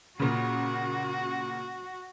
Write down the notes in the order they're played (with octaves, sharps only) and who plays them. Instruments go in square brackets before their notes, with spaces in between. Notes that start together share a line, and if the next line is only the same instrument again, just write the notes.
[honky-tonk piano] A#2 C#3 [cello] F#4